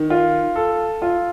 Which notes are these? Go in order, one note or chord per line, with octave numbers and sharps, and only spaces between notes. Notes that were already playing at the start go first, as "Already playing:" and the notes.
Already playing: D#3
F4
A4
F4